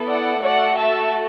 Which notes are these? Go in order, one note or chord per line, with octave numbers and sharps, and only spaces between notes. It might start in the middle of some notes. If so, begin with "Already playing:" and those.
Already playing: B3 E4 A4
D5 F#5
A3 F#4 A4 D5 F#5
E5 A5